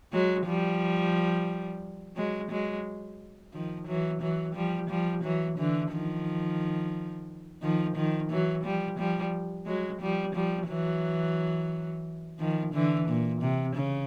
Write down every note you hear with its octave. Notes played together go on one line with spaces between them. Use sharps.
F#3 G#3
F3 G3
F#3 G#3
F#3 G#3
D#3 F3
E3 F#3
E3 F#3
F3 G3
F3 G3
E3 F#3
D3 E3
D#3 F3
D#3 F3
D#3 F3
E3 F#3
F3 G3
F3 G3
F#3 G#3
F3 G3
F3 G3
E3 F#3
D#3 F3
D3 E3
A#2
C3
C#3